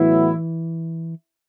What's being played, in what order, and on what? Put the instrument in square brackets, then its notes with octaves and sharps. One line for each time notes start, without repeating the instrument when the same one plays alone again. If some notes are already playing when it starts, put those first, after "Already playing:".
Already playing: [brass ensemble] A2 F#3 B3 E4 [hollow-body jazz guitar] E3